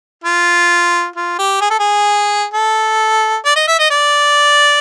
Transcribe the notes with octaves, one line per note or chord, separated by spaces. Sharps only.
F4
F4
G4
G#4
A4
G#4
A4
D5
D#5
E5
D#5
D5